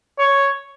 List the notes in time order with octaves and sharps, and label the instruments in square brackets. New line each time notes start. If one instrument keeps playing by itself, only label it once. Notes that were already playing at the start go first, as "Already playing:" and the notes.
[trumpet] C#5